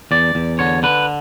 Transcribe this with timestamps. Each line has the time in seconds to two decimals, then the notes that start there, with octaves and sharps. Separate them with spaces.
0.11 E2 D5
0.35 E2
0.59 D3 C#5
0.83 D3 B4